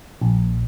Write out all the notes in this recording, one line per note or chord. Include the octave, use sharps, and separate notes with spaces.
A#1